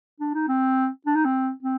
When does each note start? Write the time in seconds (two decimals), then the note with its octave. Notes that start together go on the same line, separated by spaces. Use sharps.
0.20 D4
0.34 D#4
0.48 C4
1.06 D4
1.15 D#4
1.25 C4
1.63 C4